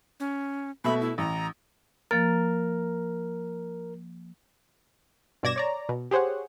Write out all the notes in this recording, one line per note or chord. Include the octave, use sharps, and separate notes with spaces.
C#4
B2 A3 E5 B5
E4
A1 A#5
F3 A#3 A#4 A6
G2 B2 D5 G#6 A#6 E7
C#5 D5 A#5
B2
G4 G#4 C5 C#5 F#5